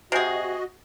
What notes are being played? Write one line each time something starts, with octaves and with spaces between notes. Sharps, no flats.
C3 F#4 G#4 D#5 F#5 G#5 C7